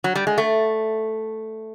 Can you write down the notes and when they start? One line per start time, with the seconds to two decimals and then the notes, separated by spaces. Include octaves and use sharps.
0.04 F#3
0.15 G3
0.27 G#3
0.38 A3